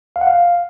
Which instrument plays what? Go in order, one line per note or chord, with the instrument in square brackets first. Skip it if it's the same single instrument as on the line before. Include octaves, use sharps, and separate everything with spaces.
[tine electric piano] F5
F#5
F5